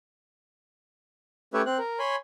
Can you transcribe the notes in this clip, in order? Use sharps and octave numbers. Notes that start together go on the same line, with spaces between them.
A3 C#4 G4 B4 C#5 E5
C4 F#6
A#4
C#5 G#5 B5 C6